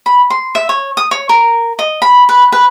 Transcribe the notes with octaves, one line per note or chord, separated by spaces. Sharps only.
B5
C6
E5
C#5
D#6
C#5
A#4
D#5
B5
B4
B4